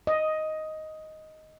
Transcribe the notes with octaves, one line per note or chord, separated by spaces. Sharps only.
D#5